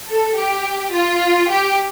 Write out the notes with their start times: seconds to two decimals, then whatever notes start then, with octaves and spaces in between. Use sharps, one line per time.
0.09 A4
0.38 G4
0.95 F4
1.52 G4